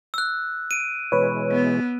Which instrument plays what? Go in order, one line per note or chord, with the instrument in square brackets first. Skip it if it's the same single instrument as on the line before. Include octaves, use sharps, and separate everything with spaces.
[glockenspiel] E6 F#6
D7 D#7
[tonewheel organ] B2 E3 G#3 [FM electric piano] B4 C#5
[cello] B3